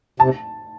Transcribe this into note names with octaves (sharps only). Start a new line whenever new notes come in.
C3 A5